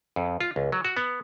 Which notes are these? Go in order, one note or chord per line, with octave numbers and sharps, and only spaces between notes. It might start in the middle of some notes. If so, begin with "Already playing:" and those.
F2
F4
C#2
F#3
F#4
B3